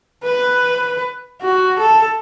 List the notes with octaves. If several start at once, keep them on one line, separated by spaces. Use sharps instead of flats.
B4
F#4
A4